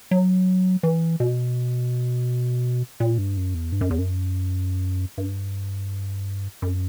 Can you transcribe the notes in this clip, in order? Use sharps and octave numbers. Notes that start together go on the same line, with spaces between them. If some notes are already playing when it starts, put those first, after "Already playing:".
F#3
E3
B2
A#2
G2
F#2
E2
G2
F#2
E2
F#2
G2
F#2